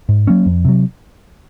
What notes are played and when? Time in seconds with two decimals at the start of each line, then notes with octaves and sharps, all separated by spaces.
0.09 G#2
0.27 F#3 A#3 C#4
0.46 F2
0.65 C3 F#3